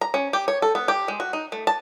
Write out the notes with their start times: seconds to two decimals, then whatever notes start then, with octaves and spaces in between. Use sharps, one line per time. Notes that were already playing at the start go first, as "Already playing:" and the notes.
0.01 A#5
0.14 C#4
0.33 G4
0.48 C#5
0.62 A4
0.75 B3
0.88 G4
1.08 G#3
1.20 F#4
1.33 D#4
1.52 A3
1.67 A5